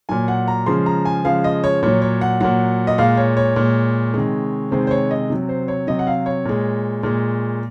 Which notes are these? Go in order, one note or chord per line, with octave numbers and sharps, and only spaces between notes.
A#2 F#3 G#5
F#5
A#5
C#3 F3 G#3 C6
A#5
G#5
C#3 F3 G#3 F5
D#5
C#5
A#2 F#3 C#5
C#5
F#5
A#2 F#3 F#5
D#5
A#2 G#3 F5
C#5
C#5
A#2 G#3
C3 D#3 G#3
C3 D#3 G#3 C5
C5
C#5
D#5
C3 F#3
C5
C#5
C3 F#3 D#5
F#5
F5
C#5
A#2 G#3
A#2 G#3